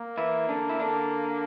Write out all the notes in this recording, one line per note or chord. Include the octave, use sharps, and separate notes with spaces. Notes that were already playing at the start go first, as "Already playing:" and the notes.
Already playing: A#3
E3 E4
D3 D4
E4
D3 D4